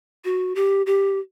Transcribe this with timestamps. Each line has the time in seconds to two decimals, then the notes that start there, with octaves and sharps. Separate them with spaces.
0.25 F#4
0.55 G4
0.86 G4